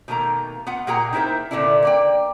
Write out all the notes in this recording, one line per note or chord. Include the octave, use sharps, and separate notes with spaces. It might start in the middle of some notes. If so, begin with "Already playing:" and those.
B2 D#3 A3 A#3 A#5
B3 F4 F#5
A#2 A#3 G#4 F#5 G5 A#5
D#4 E4 A#4 C5 E5
A#2 D3 B3 D4 E4
A#3 D5 G5